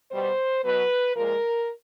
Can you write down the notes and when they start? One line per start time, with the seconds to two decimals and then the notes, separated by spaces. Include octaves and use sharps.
0.11 B2 G3 C5
0.64 B2 F#3 B4
1.15 A#2 F3 G#3 A#4